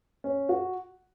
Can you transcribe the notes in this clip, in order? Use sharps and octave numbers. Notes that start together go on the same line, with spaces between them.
C#4
F#4